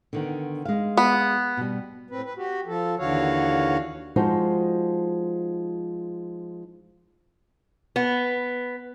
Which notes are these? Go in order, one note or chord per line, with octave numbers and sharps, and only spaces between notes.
D3 D#3 B3
G#3 F5
B3
B2 G3
A2 C4 B4
B4
F#4 G4
F3 A4
D#2 D3 E3 F#4 C#5 F5
F3 G#3 D#4 F#4 C5
B3